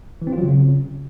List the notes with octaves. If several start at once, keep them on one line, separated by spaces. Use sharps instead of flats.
E3
C4
F4
F#3
C#3